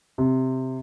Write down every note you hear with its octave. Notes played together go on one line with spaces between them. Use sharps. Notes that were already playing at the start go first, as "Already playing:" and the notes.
C3